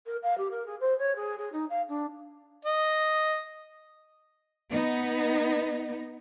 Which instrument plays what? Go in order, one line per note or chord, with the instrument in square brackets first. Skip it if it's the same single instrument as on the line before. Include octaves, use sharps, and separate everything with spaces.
[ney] A#4
F5
G4
A#4
G#4
C5
C#5
G#4
G#4
D#4
F5
D4
[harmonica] D#5
[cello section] B3 D#4